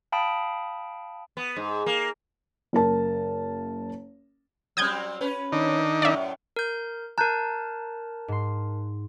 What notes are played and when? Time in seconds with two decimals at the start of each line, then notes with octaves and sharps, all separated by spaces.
0.12 F5 G5 A5 B5 D#6 D7
1.37 B3
1.57 G#2
1.86 A#3
2.73 F#1 A#4 A5
4.77 F#3 G3 C4 D#6 G6 G#6
5.21 C#4 B4
5.52 D#3 D4 D#4
6.02 F#2 A2 D5 E5
6.56 A#4 G6
7.18 A#4 A5 A#5 F#6 G6
8.28 G#2 C6